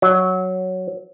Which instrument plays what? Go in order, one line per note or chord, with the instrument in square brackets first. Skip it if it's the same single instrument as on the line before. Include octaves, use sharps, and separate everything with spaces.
[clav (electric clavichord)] F#3